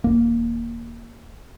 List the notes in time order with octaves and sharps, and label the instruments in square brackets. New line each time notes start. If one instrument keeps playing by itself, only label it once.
[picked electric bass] D#1 D#2 A#3